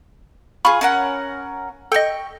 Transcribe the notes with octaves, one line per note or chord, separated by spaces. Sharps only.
F4 G#4 B5 C#6
C#4 A#4 F#5
A4 D#5 G5 C#6